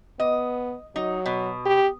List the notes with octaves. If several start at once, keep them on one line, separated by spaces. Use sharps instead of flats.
B3 D#5
F#3 D#4
B2
G4